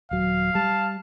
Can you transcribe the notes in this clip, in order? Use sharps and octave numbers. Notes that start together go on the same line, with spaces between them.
D#1 F#3 F5
G3 A5